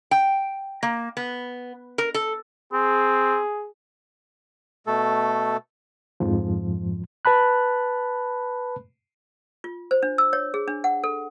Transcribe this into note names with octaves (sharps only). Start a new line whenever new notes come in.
G5
A#3
B3
A#4
A4
C4 G#4
B2 A3 A4
F2 G#2 F3
B4 A5 B5 F#6
F4
C5
D4
E6
C#5
G#4
D4
F#5
A4